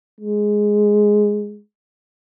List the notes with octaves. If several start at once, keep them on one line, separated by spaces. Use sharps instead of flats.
G#3